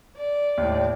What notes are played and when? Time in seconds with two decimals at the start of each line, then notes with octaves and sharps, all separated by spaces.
0.17 D5
0.58 D#2 A2